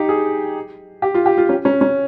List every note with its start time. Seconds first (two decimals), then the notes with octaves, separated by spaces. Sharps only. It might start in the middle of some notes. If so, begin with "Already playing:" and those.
Already playing: D#4 G4
0.09 G#4
1.02 G4
1.14 F4
1.26 G4
1.38 F4
1.49 C#4
1.65 C#4
1.81 C#4